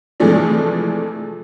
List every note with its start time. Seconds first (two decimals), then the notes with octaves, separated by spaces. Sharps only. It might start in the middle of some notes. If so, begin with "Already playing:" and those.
0.20 C3 E3 F3 G#3 A3 D4